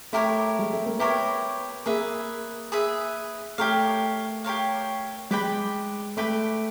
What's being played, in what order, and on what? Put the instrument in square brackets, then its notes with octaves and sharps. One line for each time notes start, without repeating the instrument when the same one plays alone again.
[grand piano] A3 [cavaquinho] E4 G4 A#4 C#5
[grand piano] G#3
A3
A#3
[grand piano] B3 [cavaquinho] E4 G4 A#4 C#5
[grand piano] A#3 [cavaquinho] G#4 B4 E5
[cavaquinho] G#4 B4 E5
[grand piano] A3 [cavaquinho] G4 A#4 C#5 F5
[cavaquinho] G4 A#4 C#5 F5
[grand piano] G#3 [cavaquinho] B4 D5 G5 B5
[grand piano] A3 [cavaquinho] B4 D5 G5 B5